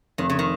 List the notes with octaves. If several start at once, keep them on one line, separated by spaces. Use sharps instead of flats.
F1 D#3
C#3
D#3